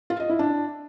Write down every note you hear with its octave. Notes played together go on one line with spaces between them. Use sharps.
F4
D#5
E4
D4